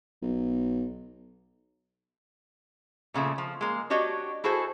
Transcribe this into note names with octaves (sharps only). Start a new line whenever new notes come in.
B1
A#2 C#3 F3 A3
F3
G#3 A#3
D4 F#4 G4 C#5 D#5
E4 F#4 G#4 A4 C5